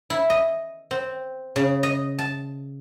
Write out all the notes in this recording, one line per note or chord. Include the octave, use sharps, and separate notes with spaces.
E4
D#5
C4
C#3
D#5
A5